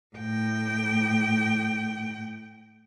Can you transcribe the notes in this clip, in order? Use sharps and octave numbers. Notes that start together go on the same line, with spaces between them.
A2 G5